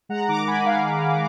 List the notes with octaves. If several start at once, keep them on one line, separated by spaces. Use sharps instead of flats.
G#3 F#5 A#5
D#3 A#5 D6
G#3 G#5 B5
G#3 F5 G#5